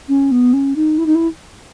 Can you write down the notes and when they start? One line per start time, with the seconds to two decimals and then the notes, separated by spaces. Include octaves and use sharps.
0.08 C#4
0.31 B3
0.53 C#4
0.76 D#4
0.98 E4
1.06 D#4
1.15 E4